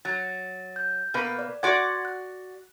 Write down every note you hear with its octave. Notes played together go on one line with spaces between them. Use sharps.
F#3 A6
G6
B2 A#3 B4
D5
F#4 D5 F#5 C6 D6 G#6
F#6